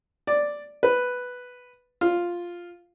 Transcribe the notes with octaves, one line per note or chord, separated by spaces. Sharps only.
D5
B4
F4